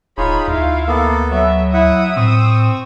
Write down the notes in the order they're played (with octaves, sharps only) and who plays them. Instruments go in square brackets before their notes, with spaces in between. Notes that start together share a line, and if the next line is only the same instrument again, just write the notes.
[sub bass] D1 [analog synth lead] D#4 [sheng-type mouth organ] F4 G#4 C#5 [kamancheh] B5
[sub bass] D2 [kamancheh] E4 F5 [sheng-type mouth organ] F4
[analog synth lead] A#3 [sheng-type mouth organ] B3 A4
[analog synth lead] F#3 [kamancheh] E5
[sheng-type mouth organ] E4 E5 F#5 [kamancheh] D#6 E6
[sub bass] A2 [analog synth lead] C4 [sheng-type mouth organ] C#6